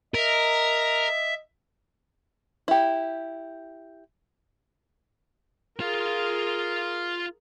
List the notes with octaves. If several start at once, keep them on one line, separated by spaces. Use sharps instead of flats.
A#4 D#5 E5
E4 G4
F4 G#4 A#4 F5